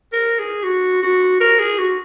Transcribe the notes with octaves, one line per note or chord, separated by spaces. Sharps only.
A#4
G#4
F#4
F#4
A#4
G#4
F#4